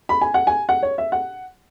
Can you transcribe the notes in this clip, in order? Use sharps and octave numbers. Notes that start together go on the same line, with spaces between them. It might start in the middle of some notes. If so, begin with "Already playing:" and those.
B5
G#5
F#5
G#5
F#5
C#5
E5
F#5